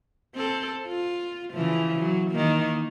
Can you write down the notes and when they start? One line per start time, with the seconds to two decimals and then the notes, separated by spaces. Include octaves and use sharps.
0.35 C4 A4
0.88 F4
1.52 C#3 E3 F3
1.99 F#3
2.31 D#3 A#3